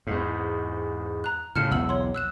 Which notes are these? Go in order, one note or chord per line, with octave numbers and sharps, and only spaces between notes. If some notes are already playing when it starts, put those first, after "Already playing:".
E2 G#2
A#5 F#6
A2 C#3 F6 C#7 E7
B1 E2 F#5 E6 F#7
C#5 C6
E6 F#6 E7